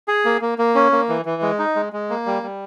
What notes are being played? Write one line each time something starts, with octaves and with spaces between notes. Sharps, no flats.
G#4
A#3
A#3
A#3
C#4
A#3
E3
E3
G#3
D#4
G#3
G#3
A#3
G3
G3